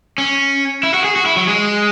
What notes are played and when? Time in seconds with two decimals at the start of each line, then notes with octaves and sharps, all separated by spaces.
0.18 C#4
0.83 E4
0.94 F#4
1.04 G#4
1.16 F#4
1.26 E4
1.37 F#3
1.47 G#3